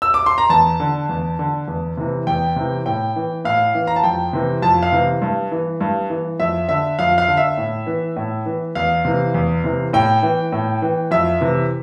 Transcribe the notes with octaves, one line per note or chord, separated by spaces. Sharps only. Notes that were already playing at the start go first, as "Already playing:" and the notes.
E6
D6
C6
A#5
E2 A5
D3
E2
D3
E2
C3 E3
E2 G5
C3 E3
A2 G5
E3
A2 F5
E3
A#5
A5
F2 G5
C3 E3
F2 A5
F5
C3 E3
G2
E3
G2
E3
F2 E5
D3 E5
F2 F5
F5
D3
E5
A2
E3
A2
E3
E2 F5
C3 E3
E2
C3 E3
A2 G5
E3
A2
E3
F2 E5
C3 E3